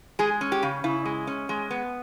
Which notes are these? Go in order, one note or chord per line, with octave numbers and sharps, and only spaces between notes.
G#3 G#4
C#4
G4
C#3
C#3 E4
G#3
C#4
G#3
B3